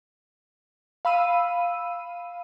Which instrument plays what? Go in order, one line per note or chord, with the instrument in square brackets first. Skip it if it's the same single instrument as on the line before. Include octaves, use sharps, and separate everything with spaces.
[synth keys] F5 B5 E6 D#7